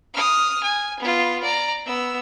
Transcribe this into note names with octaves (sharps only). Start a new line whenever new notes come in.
D#6 F6
G#5
B3 F4
D5 A#5
B3 E6